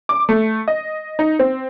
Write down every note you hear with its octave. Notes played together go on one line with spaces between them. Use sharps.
D6
A3
D#5
D#4
C4